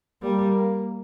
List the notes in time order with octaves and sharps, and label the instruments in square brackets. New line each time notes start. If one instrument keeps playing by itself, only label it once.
[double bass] G3 [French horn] A#3